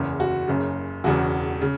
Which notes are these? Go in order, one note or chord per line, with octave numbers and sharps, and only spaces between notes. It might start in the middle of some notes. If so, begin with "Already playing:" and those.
Already playing: F#1 E2 C#3
F#4
F#1 F#2 C#3
E1 E2 C#3 F#4
C#3